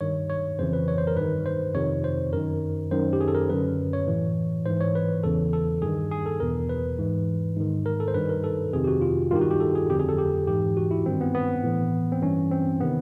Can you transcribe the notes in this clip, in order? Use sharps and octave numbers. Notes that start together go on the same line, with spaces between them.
G2 D#3 C#5
C#5
F2 C#3 E3 C5
B4
C#5
C5
A#4
G2 D#3 B4
C5
F2 C3 D#3 C#5
C5
F#2 D#3 A#4
F#2 D#3 C5
G4
G#4
A4
A#4
F#2 D3 B4
C#5
A2 E3
G#2 E3 C5
C#5
B4
E2 C#3 E3 A4
A4
G2 D#3 G#4
G#4
A4
E2 B2 A#4
B4
G#2 E3
G#2 D#3
A#4
A4
C5
G2 D#3 B4
A#4
A4
F2 C3 D#3 G#4
G4
F#4
F4
G2 D#3 F4 G4
F#4
G4
A4
G#4
F2 D3 G4
G#4
A4
G4
G#2 E3 G4
F#4
E4
G2 D#3 C4
B3
B3
A2 E3
C4
G2 E3 C#4
C4
C3 D#3 B3